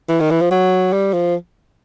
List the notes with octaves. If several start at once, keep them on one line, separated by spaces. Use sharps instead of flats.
E3
D#3
E3
F3
F#3
G3
F3